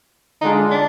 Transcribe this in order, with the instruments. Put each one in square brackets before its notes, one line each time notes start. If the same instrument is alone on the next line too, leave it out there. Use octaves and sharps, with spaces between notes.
[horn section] D3 G#3 D4 F4 [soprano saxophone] D#4
[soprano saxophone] D4